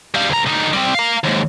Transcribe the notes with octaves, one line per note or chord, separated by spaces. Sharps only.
G3 F5
D2 A#5
D3 D#4
G3 C4
F5 A#5
D#2 G#2